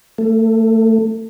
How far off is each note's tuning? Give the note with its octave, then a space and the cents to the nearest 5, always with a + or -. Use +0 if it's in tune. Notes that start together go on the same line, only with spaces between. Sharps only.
A3 +25